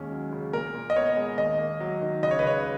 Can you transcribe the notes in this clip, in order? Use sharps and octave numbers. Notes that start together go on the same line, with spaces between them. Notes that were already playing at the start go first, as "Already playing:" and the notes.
Already playing: D#2 G#3 C#4
F#3
C#3
A#2 A#4
A#2
D#5
B3 C#5
G#3
D#2 D#5
A#3
F#3
D#3
C#2 D#5
C#5
B4
C#2 C#5